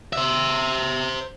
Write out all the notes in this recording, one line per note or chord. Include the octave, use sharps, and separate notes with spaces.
C5 E5